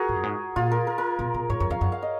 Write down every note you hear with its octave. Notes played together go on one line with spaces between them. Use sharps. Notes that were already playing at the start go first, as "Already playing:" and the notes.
Already playing: F#4 G#4 A#4
G#2
F#2
G#2
A#2 F4
A#4
A#4
A#4
B2
B2
G#2 C#5
F#2 C#5
F2 F5
F#2 F#5
F5
D#5